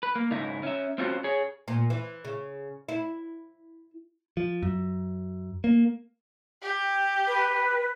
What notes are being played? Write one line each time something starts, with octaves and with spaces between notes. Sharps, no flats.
B4
A#3
G#2 C#3 D#4 E4
C#4 E5
C4 C#4 F4 F#4 C5
G#4 C#5
A#2
E3
C#3
E4
F3
F#2
A#3
G4
B4